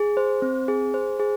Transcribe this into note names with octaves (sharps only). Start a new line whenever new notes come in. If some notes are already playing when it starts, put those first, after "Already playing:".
Already playing: G#4
C5
C4
G#4
C5
G#4